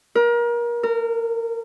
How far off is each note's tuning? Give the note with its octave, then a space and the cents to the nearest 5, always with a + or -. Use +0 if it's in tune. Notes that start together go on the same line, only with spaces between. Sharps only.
A#4 +30
A#4 -25